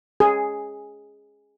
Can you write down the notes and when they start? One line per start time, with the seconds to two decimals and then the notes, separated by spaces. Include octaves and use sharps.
0.20 G#4